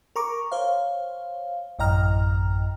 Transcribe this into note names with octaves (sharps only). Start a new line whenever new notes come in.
A#4 A#5 C#6 D6
C5 C#5 F5
A1 F#2 D#5 G5 A#5 F6